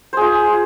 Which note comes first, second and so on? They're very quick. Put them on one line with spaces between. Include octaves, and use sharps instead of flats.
C5 G#4 F4